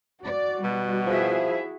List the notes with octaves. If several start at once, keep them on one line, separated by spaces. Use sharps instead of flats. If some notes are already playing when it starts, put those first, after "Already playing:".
F#4 D5
B2 G3
F3 E4 G#4 E5